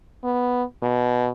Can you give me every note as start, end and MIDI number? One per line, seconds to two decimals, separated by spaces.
0.24 0.63 59
0.83 1.28 47